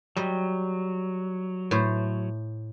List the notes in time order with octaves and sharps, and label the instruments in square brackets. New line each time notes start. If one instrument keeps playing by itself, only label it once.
[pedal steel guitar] F#3 [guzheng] G3 D#5
[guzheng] A2 C5